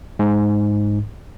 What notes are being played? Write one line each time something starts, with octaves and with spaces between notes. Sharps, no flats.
G#2